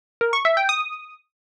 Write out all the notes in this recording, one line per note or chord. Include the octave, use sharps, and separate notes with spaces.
A#4
C#6
E5
G5
D#6